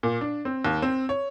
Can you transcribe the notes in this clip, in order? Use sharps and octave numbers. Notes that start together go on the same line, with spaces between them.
A#2
D4
C4
D#2
C4
C#5